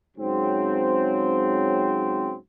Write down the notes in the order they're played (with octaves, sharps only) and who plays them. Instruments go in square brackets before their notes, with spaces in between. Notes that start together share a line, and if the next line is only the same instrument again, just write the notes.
[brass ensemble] G#2 C#3 F#3 C4